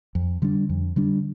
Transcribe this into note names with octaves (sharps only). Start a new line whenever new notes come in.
F2
D3 G3 D4
F2
D3 G3 D4